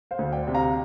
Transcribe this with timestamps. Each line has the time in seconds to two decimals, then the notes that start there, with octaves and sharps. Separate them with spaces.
0.11 C5 F5
0.19 D2
0.32 D5 G5
0.47 C3
0.55 F5 A#5